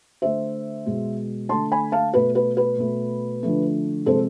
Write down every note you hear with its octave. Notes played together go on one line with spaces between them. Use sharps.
D3 A3 C5 E5
B2 G#3
D3 A3 A5 C6
G#5 B5
F5 A5
B2 A3 B4
B4
B4
B2 A3
D3 F3 A3
C3 F3 G#3 A4 C5